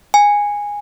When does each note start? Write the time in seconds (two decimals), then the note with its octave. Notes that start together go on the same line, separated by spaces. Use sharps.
0.14 G#5